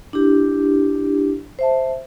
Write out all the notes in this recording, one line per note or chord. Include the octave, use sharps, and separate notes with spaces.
D4 E4 G4
C5 E5 A5